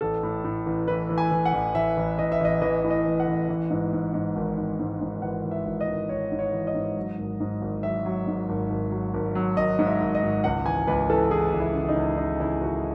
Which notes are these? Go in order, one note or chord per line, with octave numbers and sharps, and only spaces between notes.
A1 A4
A2
A2
A1
E3 B4
E3
G#5
E3
F#5
A1
A1 E5
A1
A1 D#5
E5
A1 D#5
E3 D#5
A2
D#5
E3
F#5
A1
E3
G#2
G#2
G#2
G#1
G#1
G#2
G#2
E3 F#5
E3
E5
G#1
D#5
G#1
G#1 C#5
G#2
C#5
E3
D#5
G#2
F#3
G#1
G#2
G#1
F#3 E5
F#3
G#2
G#1
G#1
F#3
G#1
F#3
G#1 D#5
G#2
E5
G#1
D#5
G#1
C#2 F#5
E3 G#5
C#2 B4
E3 A4
E3 G#4
C#2
E4
C#3
D#4
C#2
C#3 D#4
C#2 E4
C#2 F#4